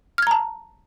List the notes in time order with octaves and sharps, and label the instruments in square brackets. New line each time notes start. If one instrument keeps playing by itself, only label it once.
[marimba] F6
G#6
A#5
A5